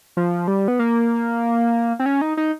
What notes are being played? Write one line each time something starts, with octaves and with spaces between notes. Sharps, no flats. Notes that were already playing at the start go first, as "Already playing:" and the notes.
F3
G3
B3
A#3
C4
C#4
D#4
D#4